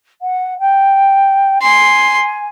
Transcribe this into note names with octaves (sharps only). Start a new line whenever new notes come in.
F#5
G5
G#5 C6